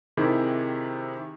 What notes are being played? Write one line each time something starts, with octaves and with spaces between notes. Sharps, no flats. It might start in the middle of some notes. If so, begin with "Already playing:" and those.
C3 D#3 E4 G4 G#4